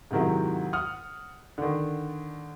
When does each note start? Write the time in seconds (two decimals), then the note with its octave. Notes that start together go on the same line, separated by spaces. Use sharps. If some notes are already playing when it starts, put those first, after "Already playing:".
0.11 G#2 C3 D#3 F#3 E4
0.73 F#5 D#6 F6
1.58 D3 D#3